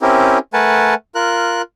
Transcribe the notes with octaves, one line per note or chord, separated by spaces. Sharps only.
C4 C#4 E4 G4 A#4
A3 A#4 B4 F#5 G#5 A5
F4 A#4 F#6